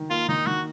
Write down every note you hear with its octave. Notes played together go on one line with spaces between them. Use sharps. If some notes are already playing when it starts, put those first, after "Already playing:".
Already playing: D#3
A#3 F4
D#3 D#4
D#3 F#4